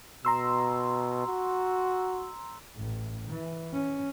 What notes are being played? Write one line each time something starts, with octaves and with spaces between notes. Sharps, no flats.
B2 A#5 C6 E6
F#4
A1
E3
C#4